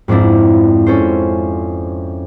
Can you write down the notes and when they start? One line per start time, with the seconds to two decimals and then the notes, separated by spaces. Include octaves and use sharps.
0.08 F2 G#2 C4 D4 E4
0.86 C#4 A4 C5